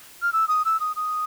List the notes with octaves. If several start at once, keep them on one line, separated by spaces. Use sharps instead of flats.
F6
E6
D#6
E6
D#6
D#6